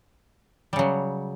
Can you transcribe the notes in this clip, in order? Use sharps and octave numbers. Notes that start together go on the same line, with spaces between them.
C#3 F#3 G3